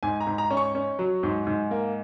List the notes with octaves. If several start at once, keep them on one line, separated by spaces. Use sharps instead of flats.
G#2 G#5
A#5
G#2
A#5
C#4
C#6
C#4
F#3
G#2
G#2
A#3